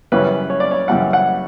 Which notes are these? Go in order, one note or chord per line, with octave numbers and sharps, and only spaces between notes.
F#2 C#3 E3 G3 C#4 B4
C#5
D5
C#5
F#2 C#3 E3 G3 C#4 F#5
F#5